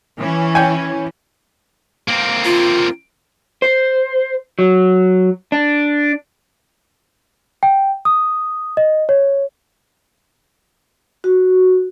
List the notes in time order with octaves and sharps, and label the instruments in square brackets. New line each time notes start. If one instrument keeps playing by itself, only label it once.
[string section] E3 C#4
[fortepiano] C#5 G5 G#5
[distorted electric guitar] A#3 C4
[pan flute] F4
[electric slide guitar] C5
F#3
D4
[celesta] G5
D#6
D#5
C#5
[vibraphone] F#4